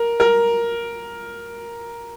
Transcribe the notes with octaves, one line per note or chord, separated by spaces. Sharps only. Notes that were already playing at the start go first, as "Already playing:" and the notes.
Already playing: A#4
A#4